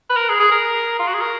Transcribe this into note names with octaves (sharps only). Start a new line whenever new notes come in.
B4
A#4
G#4
G#4
A#4
F4
F#4
G#4
A#4